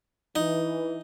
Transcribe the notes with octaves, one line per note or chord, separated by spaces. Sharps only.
E3 D#4